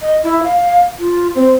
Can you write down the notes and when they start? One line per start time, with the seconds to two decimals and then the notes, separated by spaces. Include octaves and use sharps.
0.01 D#5
0.24 E4
0.43 F5
0.99 F4
1.35 C4